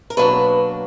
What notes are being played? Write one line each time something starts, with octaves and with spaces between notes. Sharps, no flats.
A#4
B2 F#3 A#3 D4 B4